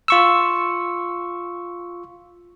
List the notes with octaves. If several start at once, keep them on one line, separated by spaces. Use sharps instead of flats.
F4 C#6 E6